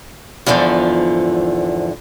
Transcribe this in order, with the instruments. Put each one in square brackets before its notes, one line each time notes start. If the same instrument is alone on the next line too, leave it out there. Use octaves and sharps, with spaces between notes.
[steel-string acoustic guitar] E2 G#2 D3 F3